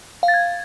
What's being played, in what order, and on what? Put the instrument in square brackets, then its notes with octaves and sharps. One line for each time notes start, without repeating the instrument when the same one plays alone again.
[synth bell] F5
A6
G#6